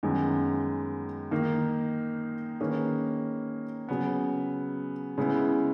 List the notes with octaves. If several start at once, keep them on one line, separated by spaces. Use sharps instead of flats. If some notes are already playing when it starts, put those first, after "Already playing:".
F#2 D#3 G#3 B3
D#3 A#3 D#4
D#3 A#3 C#4 G#4 B4
C#3 F#3 B3
C#3 G#3 B3 E4 B4